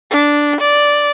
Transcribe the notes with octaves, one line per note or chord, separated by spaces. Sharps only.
D4
D5